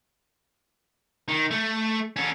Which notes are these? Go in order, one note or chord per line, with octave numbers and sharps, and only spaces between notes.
D#3
A3
C#4 A4